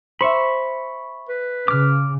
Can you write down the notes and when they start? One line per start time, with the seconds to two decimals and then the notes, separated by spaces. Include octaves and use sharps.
0.21 C5 E5 B5 C#6
1.29 B4
1.68 C#3 D6 F6